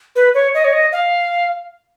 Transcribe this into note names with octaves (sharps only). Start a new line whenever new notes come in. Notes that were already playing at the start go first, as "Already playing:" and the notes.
B4
C#5
D#5
C#5
D#5
F5